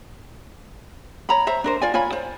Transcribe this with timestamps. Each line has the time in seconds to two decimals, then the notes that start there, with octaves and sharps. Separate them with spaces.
1.29 C#5 A#5 B5
1.47 C5 E5 A#5
1.64 D4 A#4 C5
1.82 F4 D5 G#5
1.94 F4 C#5 G#5 B5
2.13 C5